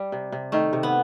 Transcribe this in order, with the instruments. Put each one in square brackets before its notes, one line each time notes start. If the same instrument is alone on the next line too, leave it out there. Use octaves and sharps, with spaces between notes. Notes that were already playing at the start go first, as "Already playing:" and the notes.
Already playing: [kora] G3
C3
C3
[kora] D#3 [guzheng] A3
[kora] C3
[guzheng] B3